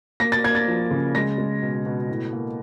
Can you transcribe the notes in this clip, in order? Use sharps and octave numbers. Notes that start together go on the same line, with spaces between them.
A#3 A#6
A6
A#3 G#6
A6
F3
C#3
G#3 A#6
G#3
B2
B2
A2
A#3